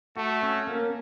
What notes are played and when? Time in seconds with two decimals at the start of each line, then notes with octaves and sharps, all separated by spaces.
0.17 A3 F#4
0.43 C#4
0.67 A#3